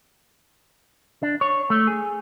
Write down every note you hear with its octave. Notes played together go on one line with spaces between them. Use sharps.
D4
C#5
A3
G#4